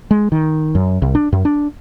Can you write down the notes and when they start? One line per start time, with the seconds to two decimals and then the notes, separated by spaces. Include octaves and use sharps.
0.11 G#3
0.32 D#3
0.75 F#2
1.02 C2
1.15 D4
1.32 F#2
1.45 D4